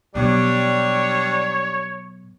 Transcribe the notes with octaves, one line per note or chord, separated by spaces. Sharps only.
B2 F#3 G3 D4 C#5